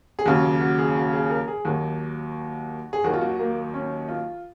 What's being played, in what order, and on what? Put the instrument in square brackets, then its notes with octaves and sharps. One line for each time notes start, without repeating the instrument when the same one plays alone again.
[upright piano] G#4
D#2 C#3 F#3 F#4
F#4
G#4
F#4
G#4
A#4
G#4
D#2 D#3 F#3 F#4
G#4
D#2 D#3 F#3 F#4
F4
F#4
A#3
C#4
F4